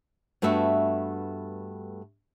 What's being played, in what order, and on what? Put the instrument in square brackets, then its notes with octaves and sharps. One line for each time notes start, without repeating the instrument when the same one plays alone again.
[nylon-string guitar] G2 A3 B3 F#4 E5